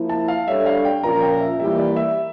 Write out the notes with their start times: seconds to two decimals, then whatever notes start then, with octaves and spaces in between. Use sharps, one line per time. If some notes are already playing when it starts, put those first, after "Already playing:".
Already playing: F3 A#3 E4
0.09 A5
0.28 F5
0.47 G3 D4 A4 C#5 E5
0.66 F5
0.85 G5
1.03 A#2 F3 C#4 F4 A#4 A#5
1.22 G5
1.41 E5
1.60 E3 G3 A#3 E4 G4 E5
1.78 D5
1.96 E5